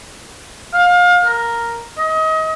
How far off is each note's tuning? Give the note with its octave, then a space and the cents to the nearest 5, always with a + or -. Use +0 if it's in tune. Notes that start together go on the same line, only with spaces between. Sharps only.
F5 +30
A#4 +0
D#5 +30